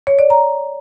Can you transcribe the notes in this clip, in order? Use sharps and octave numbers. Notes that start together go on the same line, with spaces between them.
C#5
D5
A#5